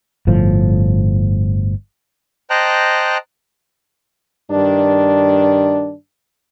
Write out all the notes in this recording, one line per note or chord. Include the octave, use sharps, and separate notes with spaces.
G1 A2 F3
C5 D#5 G5 A5 A#5 F#6
G2 D#3 D4